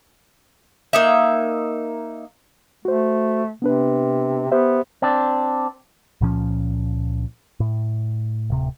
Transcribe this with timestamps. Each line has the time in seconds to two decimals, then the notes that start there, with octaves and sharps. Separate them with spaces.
0.93 A#3 D#4 E5
2.85 A3 F#4 C5
3.62 C3 B3 D4 B4
4.52 B3 G4 C5 E5
5.02 C4 D4
6.21 C#2 A#2 F3 C#4
7.60 A2
8.50 D1 C3